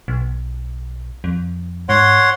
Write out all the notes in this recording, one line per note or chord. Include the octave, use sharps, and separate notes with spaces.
B1
F2
G#2 C#5 F#5 C6